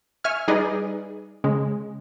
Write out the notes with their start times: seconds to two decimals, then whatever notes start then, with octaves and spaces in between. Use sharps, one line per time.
0.24 E5 G#5 C#6 F6
0.48 G3 D#4 G#4 B4 D5 D#5
1.44 C#3 G#3